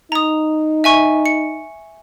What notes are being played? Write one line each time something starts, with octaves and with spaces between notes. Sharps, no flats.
D#4 A#5 D#6
E5 G#5 C#6
C#7